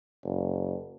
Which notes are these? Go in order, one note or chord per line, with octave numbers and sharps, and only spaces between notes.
F#1